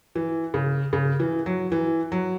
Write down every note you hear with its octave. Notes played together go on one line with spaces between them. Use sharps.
E3
C#3
C#3
E3
F#3
E3
F#3